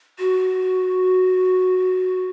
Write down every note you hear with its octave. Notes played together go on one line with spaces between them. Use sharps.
F#4